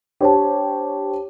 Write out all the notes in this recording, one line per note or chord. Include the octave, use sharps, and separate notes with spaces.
D4 G4 C5 C#5 A5